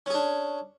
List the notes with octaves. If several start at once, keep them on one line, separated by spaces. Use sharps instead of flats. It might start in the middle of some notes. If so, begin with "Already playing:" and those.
C#4 D4 G#4